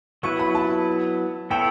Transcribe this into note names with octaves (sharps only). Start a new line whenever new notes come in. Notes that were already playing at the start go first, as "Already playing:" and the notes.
F#3 B3 E4 B4 C#6
B5
A5
B3 E4 A4 C#5 G5